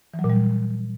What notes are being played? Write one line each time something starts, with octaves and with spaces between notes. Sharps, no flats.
E3
F#3
A#2
G3